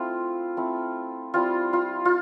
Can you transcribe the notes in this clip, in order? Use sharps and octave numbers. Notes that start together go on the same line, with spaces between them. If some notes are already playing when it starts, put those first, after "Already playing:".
Already playing: A3 C4 E4 F4
A3 C4 E4
G3 C4 E4 F4
F4
F4